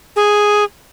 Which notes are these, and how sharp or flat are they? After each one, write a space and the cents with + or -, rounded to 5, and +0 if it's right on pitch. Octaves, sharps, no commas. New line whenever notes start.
G#4 +0